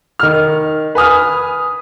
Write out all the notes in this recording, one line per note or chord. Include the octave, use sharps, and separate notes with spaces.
D#3 F6
B4 G#5 D#6 F6